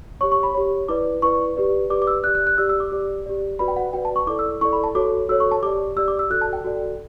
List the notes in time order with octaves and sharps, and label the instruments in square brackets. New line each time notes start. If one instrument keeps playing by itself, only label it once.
[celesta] G4 C#5 C#6
C#6
B5
G4 C#5
E4 B4 D5 D6
E4 B4 D5 C#6
G4 B4 D5
G4 B4 D5 D6
D6
E6
G4 D5 F#6
F#6
F#6
G4 D5 E6
E6
D6
G4 D5
G4 D5
F#4 B4 D5 B5
G5
F#5
F#4 B4 D5 G5
A5
C#6
E4 A4 D5 D6
E6
E4 A4 D5 C#6
B5
A5
F#4 A4 C#5 D6
F#4 A4 C#5 E6
C#6
A5
G4 D5 D6
G4 D5 E6
D6
E6
F#4 A4 D5 F#6
A5
G5
F#4 A4 D5